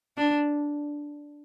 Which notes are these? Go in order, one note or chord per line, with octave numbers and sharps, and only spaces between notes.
D4